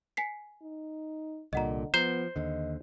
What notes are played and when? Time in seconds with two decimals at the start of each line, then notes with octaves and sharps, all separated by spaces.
0.17 G#5 B6 C7
0.62 D#4
1.53 C2 A#2 D3 D#5 F#5 A#5
1.94 F3 B3 C5 A#5
2.36 D#2 D3 D#5